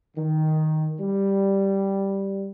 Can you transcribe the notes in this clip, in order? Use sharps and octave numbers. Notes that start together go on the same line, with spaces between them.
D#3
G3